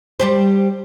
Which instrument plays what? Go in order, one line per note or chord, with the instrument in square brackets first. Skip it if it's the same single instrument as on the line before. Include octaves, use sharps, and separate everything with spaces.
[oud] G3 G4 C5